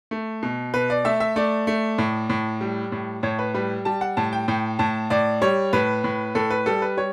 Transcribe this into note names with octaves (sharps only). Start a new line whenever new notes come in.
A3
B2
B2 B4
D5
A3 E5
E5
A3 D5
A3
A2
A2
G3
A2
A2 C#5
B4
G3 B4
G3 A5
F#5
A2 A5
G5
A2 G5
A2 A5
A2 D5
G3 C#5
A2 B4
A2
A2 A4
B4
G3 A4
B4
G3 C#5